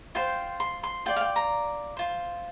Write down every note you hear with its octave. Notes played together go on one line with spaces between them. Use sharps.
F4 C5 G5
C6
C6
F4 D5 G5
F5
G5
A#5
F4 C5